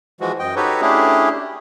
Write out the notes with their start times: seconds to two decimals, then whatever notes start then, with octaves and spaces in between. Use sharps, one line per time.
0.21 E3 F3 G#3 F#4
0.39 F#2 D#5 G5
0.56 D#4 F#4 G4 A4 B4 C#5
0.81 A3 C#4 D4 E4 G4 G#4